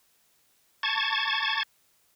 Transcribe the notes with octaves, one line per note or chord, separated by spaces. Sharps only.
A5 C#6 G#6 A6